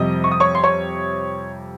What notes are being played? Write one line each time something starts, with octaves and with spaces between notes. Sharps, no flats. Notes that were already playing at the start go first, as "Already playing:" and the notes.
Already playing: F2 C3 G3 D#5 D#6
C#6
D#6
C#5 C#6
C6
C#5 C#6